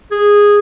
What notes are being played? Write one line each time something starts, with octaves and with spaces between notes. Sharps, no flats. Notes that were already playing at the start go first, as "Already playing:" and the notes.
G#4